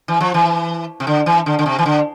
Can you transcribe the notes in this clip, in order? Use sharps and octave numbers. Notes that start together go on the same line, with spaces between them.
E3
F3
E3
C3
D3
E3
D3
D3
C3
E3
D3